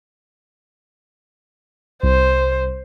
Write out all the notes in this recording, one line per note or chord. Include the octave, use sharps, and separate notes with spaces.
C2 C5